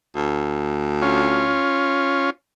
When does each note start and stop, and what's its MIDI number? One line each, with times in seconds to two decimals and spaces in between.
0.16 1.59 38
1.02 2.30 61
1.02 2.30 65